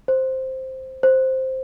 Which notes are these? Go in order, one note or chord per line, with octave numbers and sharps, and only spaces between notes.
C5
C5